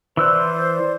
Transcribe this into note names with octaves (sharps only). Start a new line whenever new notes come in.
E3 C5 D5 E6 F#6